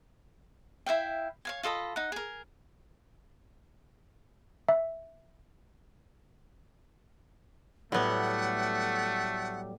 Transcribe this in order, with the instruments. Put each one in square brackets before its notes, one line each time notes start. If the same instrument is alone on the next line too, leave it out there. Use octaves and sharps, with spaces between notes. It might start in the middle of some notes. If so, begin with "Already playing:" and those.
[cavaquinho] E4 E5 F5 G5
C#5 F5 G#5
F4 A4 D#5 B5
D#4 F#5
G#4 A#4
[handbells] E5
[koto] A2 B3 [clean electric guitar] F#3 G3 [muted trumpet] A3 [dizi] F#5